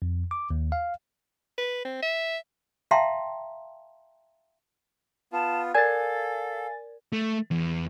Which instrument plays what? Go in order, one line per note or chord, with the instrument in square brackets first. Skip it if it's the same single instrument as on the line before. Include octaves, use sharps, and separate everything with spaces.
[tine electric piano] F2
D6
D#2
F5
[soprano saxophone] B4
C4
E5
[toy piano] E5 F5 G5 A5 A#5 C6
[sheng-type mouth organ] B3 F4 [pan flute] A5
[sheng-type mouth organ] A4 [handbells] A#4 D5 G#6 [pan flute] F5 [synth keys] G#5 A6
[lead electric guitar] A3
E2